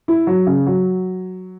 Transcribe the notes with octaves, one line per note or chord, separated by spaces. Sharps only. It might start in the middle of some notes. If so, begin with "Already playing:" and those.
E4
F#3
C#3
F#3